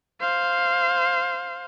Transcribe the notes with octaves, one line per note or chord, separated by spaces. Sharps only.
C5 F5